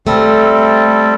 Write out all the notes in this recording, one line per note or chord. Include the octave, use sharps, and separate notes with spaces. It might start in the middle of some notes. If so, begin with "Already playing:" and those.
G3 A3 C4 A4